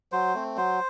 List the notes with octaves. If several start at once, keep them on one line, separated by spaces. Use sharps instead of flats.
F#3 C5
A3 C4
F#3 C5